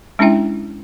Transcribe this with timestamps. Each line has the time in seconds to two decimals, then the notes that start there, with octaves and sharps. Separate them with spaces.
0.19 G#3 C#4 D4 E4 E5 G5